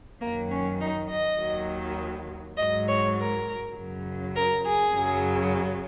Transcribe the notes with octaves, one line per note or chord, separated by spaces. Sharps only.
F#2 D#3 F#3 A#3
C#4
D#4
D#5
D#2 D#3 F#3
G#2 F#3 D#5
C#5
A#4
F#2 C#3 F#3
A#4
G#4
F#2 C#3 F#3